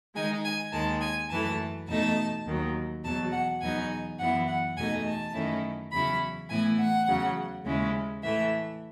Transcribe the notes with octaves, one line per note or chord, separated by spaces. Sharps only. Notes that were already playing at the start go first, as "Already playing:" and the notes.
D#3 G#3 D#4 G#5
G#5
D#2 D#3 G#3 A5
G#5
F#2 E3 A3 A5
E2 B2 A3 D#4 A5
D#2 D#3 F#3
E2 B2 F#3 A5
F#5
E2 B2 F#3 B3 D#4 G#5
F#2 E3 B3 E4 F#5
F#5
E2 B2 A3 D#4 G#5
A5
F#2 D#3 A3 C#4 E4
E2 C#3 F#3 C#4 E4 B5
A2 E3 B3 E4 G#5
F#5
E2 C#3 F#3
D#2 C#3 G#3 C#4 E4
A2 E3 A3 E5